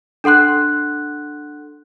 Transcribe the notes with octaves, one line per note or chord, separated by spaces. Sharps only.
D4 A4 F#5 C6 F#6